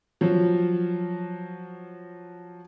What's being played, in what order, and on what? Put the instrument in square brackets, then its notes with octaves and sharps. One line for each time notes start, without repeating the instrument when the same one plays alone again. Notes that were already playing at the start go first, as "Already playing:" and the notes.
[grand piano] F3 F#3